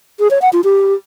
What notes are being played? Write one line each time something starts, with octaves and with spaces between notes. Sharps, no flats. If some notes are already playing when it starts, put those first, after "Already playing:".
G#4
C#5
F#5
F4
G4